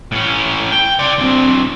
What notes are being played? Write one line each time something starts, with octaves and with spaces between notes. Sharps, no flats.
A2 C#4
G5
D5 C6
D2 C4